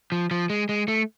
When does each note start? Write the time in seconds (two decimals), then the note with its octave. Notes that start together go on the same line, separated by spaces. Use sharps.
0.12 F3
0.31 F3
0.50 G#3
0.69 G#3
0.88 A3